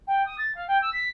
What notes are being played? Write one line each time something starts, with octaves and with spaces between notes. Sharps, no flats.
G5
D#6
A6
F5
G5
E6
B6